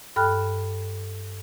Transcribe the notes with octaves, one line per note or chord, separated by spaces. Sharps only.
G2 A4 G5 B5 F6 F#6